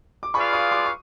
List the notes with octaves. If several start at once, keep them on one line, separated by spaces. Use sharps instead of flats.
D6
F4 G#4 B4 D5 F5 B5 C#6
C#6 D#6
C6 D6
C#6